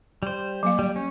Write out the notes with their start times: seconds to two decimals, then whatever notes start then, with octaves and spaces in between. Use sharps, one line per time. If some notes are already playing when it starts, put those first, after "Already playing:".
0.23 G3 C5
0.63 F#3 A#3 F5
0.79 G3
0.96 C#4